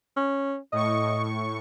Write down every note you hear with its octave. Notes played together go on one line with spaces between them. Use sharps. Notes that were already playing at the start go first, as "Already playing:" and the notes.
C#4
A2 D#5 C#6